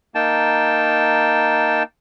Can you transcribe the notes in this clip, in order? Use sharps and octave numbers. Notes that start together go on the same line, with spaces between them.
A#3 D#4 G5 A5